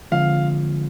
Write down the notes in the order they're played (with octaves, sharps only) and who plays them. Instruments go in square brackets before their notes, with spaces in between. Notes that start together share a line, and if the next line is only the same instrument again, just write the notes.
[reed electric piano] D3 F3 G#3 C4 F4 [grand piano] F5